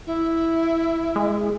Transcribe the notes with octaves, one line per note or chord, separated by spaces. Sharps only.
E4
G#3